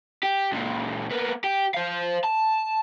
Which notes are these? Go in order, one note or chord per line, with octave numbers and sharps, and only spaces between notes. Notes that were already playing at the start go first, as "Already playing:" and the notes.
G4
C#2 A#2
A#3 B3
G4
C5 F5
A5